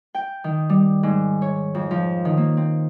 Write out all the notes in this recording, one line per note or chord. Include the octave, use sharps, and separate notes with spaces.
G5
D#3
G3
G#2
C#5
F2
F3
D#3
A#3
C4